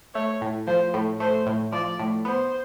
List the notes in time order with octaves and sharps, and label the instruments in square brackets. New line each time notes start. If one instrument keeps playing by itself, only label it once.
[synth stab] A3 [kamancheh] C#5
[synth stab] A2
[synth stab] F3 [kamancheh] C5
[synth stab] A2
[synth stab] A3 [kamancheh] C5
[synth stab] A2
[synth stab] F3 [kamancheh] D5
[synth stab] A2
[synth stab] B3 [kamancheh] C5